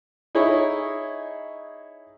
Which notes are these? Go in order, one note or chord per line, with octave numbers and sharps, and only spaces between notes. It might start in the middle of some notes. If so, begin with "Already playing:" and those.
D#4 E4 G#4 C#5